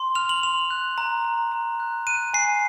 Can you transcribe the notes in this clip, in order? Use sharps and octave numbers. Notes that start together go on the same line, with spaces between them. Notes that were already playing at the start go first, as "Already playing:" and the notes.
Already playing: C6
F6 F7
F#7
C6 F7
F#6
A#5
A#5
A#5
F#6
F#6 D#7
G#5 C7